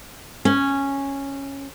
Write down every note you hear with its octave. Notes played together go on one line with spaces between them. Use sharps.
C#4